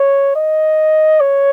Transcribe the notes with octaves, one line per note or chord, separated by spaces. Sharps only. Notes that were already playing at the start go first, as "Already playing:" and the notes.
Already playing: C#5
D#5
C#5